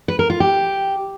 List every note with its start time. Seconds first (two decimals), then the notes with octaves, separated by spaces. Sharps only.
0.08 B4
0.19 A#4
0.30 F4
0.40 G4